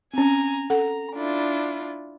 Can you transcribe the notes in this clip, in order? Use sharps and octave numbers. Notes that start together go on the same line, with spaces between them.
C4 C#4 G#5 A#5
A4 F#5 A#5
D4 E4 F4